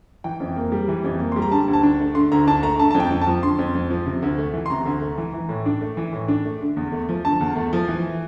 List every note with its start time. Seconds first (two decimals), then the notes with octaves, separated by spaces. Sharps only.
0.24 E3 G5
0.40 F2
0.56 A#3
0.72 G3
0.88 E3
1.04 F2
1.20 A#3
1.32 G3 C6
1.42 A#5
1.51 D3 A5
1.68 D2
1.73 A5
1.83 D4
2.00 A3
2.15 D3 C6
2.31 D2 A#5
2.47 D4 A5
2.63 A3 A#5
2.79 D3 A5
2.91 F2 A5
3.00 G5
3.11 F2
3.21 A5
3.27 F3
3.43 D3 C6
3.59 F2
3.75 F2
3.90 F3
4.06 C3
4.22 D2
4.38 A3
4.54 E3
4.66 C6
4.70 C3 A#5
4.86 D2
5.01 A3
5.18 E3
5.34 E3
5.49 A2
5.66 D4
5.81 A3
5.97 E3
6.13 A2
6.28 D4
6.45 A3
6.61 D3
6.76 E2
6.92 A3
7.09 F3
7.25 D3 A5
7.40 E2
7.56 A3
7.73 F3
7.88 E3